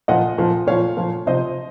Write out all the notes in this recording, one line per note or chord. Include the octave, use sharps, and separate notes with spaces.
A#2 F3 D#5 F#5
A#2 F3
A#2 F3 C#5 F5
A#2 F3
C3 F3 C5 D#5